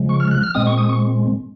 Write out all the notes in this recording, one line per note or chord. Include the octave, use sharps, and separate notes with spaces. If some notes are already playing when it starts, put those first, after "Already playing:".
Already playing: C#3 F3 G#3
C#6
F6
F#6
F6
A#2 G#3 C4 D#6
C#6
D#6
C#6